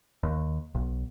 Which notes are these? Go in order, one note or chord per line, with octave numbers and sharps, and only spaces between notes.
D#2
B1